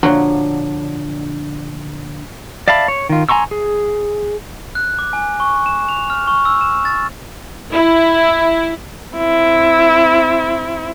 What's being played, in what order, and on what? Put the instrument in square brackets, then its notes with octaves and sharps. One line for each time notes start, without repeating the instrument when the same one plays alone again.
[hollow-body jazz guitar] A#2 D3 F3 [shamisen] F#3 [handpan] D4
[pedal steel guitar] D5 E5 F5 A5 B5
C#5
D#3 F4
G#5 A#5 C6 C#6 E6
G#4
[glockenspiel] F#6
D6
G#5
C#6
E7
F7
F6
C#6
E6
E7
A6
[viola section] E4
[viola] C4 E4